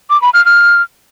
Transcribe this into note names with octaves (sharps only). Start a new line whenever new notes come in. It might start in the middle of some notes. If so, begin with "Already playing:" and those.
D6
B5
F6
F6